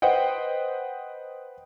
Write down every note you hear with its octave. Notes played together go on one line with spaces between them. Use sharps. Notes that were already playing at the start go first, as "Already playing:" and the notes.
B4 C5 D#5 F#5 G5